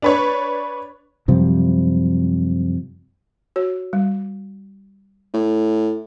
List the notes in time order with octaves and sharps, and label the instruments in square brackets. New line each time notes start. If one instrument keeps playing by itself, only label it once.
[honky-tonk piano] D4 B4 C#5
[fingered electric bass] F#2 C3 F3 G3
[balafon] F#4 C#5
G3
[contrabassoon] A2